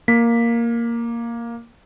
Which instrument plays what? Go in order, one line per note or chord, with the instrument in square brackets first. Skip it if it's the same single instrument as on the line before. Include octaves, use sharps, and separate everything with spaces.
[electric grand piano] A#3 B6